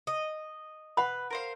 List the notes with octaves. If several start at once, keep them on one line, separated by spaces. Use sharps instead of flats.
D#5
B4 F#5 B5
A#4 C5 F5